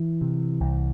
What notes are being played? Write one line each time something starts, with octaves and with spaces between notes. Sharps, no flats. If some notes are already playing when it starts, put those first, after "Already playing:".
Already playing: E3
C3
C2